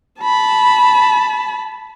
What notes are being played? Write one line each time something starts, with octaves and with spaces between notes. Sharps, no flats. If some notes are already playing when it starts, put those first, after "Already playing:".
A5 B5